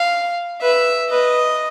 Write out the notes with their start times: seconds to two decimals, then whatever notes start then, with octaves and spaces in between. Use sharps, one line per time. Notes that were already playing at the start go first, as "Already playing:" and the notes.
Already playing: F5
0.62 B4 E5
1.10 B4 D#5